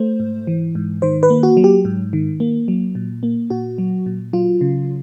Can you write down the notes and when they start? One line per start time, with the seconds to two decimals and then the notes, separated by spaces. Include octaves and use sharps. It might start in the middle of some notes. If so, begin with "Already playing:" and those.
Already playing: A3 C5
0.20 G#2
0.47 E3
0.75 G#2
1.02 D#3 C5
1.23 B4
1.30 A#3
1.43 F#4
1.57 F#3
1.64 G4
1.85 G#2
2.13 D#3
2.40 A#3
2.68 F#3
2.95 A#2
3.23 A#3
3.50 A#2 F#4
3.78 F#3
4.06 A#2
4.33 F#3 F4
4.61 C#3